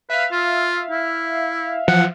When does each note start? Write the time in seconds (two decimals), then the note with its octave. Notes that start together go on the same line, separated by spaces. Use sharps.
0.10 B4 E5 F5
0.32 F4
0.90 E4
1.88 F3 F#5